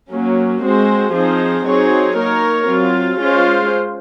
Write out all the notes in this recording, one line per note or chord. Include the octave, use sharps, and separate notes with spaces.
F#3 A#3 C#4
G#3 C4 F#4 C5
F3 C4 D#4 G#4 C5
F#3 C4 D#4 G#4 C#5
A#3 D#4 A#4 C#5
F#3 C4 F4
G#3 C#4 F4 C5